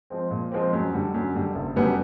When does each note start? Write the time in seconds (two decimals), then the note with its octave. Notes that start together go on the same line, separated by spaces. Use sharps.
0.10 F3 G#3 C4
0.31 A#2
0.52 F3 G#3 C4
0.73 F#2
0.94 D3 G3
1.14 F#2
1.35 D3 G3
1.55 F#1
1.76 F#2 D3 G3 B3